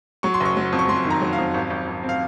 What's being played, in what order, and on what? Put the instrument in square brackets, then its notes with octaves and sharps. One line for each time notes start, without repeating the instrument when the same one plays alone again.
[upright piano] F#3 C#6
C6
F#1
C#6
F#3
F2
C#6
F#3 C6
D#3
A#5
F#3
F5
F2
G#1
G#1
G#1
C4
F5